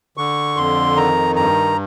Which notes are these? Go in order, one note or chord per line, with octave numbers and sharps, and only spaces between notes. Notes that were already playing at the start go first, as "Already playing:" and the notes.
D3 C#6
F2 C6
D#3 A#5
G2 A#5